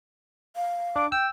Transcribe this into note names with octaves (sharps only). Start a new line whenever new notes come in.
F5
D4 D6
G5 E6